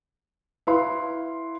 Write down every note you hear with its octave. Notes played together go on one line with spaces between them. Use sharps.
E4 B4 F5 C6